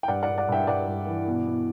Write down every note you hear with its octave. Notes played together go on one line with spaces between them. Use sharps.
G5
G2 D5 F#5
D5 F#5
G2
D5 F#5
G2 E5 G5
G2 D5 F#5
G2
E3
B2
B2